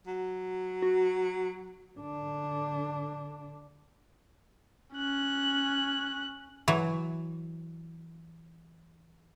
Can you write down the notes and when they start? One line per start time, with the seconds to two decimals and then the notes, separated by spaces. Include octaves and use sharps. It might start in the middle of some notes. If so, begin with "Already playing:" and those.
0.07 F#3
0.82 F#4
1.98 D3 D4
4.95 C#4 F#6
6.68 E3 F#3